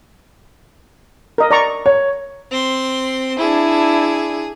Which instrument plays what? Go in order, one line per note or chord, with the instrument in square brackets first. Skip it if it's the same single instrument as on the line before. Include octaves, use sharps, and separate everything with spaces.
[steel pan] A#4 D#5
D5 A#5 C#6
[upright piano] C#5
[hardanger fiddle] C4 C6
[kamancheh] D4 E4 [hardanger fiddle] G#4